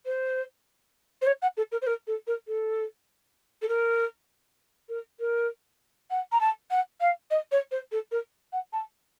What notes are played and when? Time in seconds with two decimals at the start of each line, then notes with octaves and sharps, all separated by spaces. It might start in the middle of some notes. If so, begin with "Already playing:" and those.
0.06 C5
1.21 C5
1.27 C#5
1.42 F#5
1.57 A4
1.72 A#4
1.82 C5
1.87 A#4
2.07 A4
2.27 A#4
2.47 A4
3.62 A4
3.68 A#4
4.89 A#4
5.20 A#4
6.10 F#5
6.32 A#5
6.40 A5
6.71 F#5
7.00 F5
7.31 D#5
7.51 C#5
7.71 C5
7.92 A4
8.11 A#4
8.52 F#5
8.73 A5